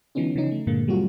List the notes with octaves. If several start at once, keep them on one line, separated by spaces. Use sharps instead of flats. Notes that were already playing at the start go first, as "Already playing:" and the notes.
D3 E3 F#3 B3 C#4 D#4
C#3 E3 F3 C#4 D#4
A3
G2 A#2 D3 G#3 A#3
F#3 G3 A3 C4 F4 F#4